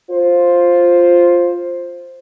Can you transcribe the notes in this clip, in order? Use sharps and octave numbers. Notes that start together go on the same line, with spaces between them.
F4 C5